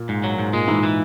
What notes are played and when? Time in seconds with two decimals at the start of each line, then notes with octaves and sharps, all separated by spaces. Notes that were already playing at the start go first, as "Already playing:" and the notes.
Already playing: A#2
0.09 G#2
0.24 F#3
0.39 G#2
0.53 A#2 G#3
0.68 G#2 E3
0.83 E3